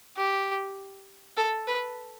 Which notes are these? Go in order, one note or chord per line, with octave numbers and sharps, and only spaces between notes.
G4
A4
B4